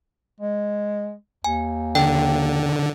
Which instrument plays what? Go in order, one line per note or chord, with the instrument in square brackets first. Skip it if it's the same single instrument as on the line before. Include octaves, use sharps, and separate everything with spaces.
[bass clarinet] G#3
[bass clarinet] D#2 [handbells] G#5
[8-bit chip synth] D3 [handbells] G5